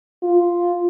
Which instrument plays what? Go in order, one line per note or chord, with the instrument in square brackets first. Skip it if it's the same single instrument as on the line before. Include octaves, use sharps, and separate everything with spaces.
[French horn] F4